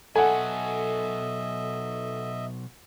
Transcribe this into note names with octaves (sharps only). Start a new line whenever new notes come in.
B2 F#3 A4 D#5 E5 F#5 G#5